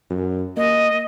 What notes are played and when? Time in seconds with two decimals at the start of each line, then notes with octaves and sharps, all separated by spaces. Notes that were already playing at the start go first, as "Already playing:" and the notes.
0.10 F#2
0.57 A#3 D#5